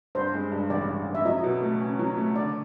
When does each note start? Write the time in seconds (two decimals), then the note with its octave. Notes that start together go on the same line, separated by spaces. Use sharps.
0.15 G2 C5
0.33 G#3
0.52 G2
0.70 A1 D5
0.88 G2
1.07 A1
1.15 E5
1.25 F#3 D#5
1.44 B2
1.62 A3
1.80 C#4
1.99 F#3
2.17 A3
2.36 D3 D5